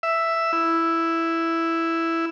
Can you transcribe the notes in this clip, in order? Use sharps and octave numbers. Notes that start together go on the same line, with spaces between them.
E5
E4